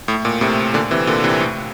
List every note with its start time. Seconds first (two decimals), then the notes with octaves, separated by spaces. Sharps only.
0.08 A2
0.25 A#2
0.41 A2 C3
0.74 A#2 D3
0.91 C3 E3
1.07 A#2 D3
1.24 C3 E3
1.40 A2